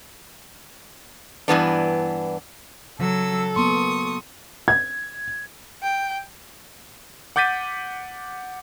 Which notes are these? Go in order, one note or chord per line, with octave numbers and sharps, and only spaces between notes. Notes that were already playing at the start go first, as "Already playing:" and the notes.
G2 E3 B3 D4
C#3 F#3 A4 E6
F#3 A#3 B3 C6 C#6 D#6
G#6
G5
F#5 D6 G6 A6 B6 D#7